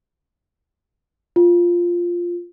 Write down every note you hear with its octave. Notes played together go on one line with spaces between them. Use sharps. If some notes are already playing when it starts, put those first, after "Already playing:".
F4